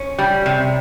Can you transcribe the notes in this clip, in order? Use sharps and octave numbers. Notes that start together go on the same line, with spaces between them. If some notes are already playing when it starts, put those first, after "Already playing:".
Already playing: C#4
G3
C3